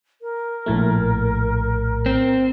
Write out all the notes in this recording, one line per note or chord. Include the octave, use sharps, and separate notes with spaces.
A#4
A#1 A2 A3
C4